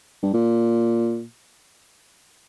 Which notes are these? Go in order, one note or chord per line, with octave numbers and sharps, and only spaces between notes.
G2
A#2